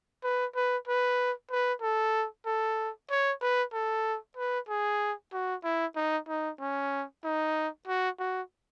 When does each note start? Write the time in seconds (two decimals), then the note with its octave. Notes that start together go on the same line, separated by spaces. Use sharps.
0.24 B4
0.55 B4
0.87 B4
1.51 B4
1.82 A4
2.46 A4
3.10 C#5
3.41 B4
3.73 A4
4.37 B4
4.69 G#4
5.33 F#4
5.64 E4
5.96 D#4
6.28 D#4
6.60 C#4
7.24 D#4
7.87 F#4
8.19 F#4